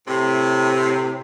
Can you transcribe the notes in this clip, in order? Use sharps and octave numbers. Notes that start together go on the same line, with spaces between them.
A2 C3